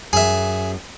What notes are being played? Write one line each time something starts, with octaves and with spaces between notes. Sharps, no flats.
F#2 G#4 E5